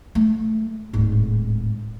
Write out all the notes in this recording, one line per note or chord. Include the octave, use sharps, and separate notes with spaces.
A3
D1 G#2